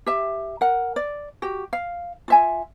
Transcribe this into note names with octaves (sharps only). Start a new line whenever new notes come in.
G4 E5
A#4 F#5
D5
F#4 G4
F5
F4 E5 G#5